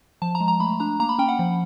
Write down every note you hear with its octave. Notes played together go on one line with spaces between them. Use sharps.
F3 A5
A#5
G#3
A#5
A3 B5
D4 A#5
A#3 A#5
B5
C#4 G5
F#5
F3